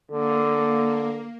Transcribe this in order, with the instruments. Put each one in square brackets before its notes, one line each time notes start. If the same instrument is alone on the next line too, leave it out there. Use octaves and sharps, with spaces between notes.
[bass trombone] D3 [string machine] A#3